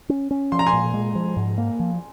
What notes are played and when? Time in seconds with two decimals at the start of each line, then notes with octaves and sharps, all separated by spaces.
0.09 C#4
0.31 C#4
0.52 F3 C6
0.59 A#5
0.66 G#5 C6
0.73 A#2
0.94 G#3
1.15 F3
1.37 G#2
1.58 A#3
1.80 F3